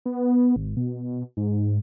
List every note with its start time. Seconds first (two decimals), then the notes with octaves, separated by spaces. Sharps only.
0.06 B3
0.56 G#1
0.77 B2
1.37 G#2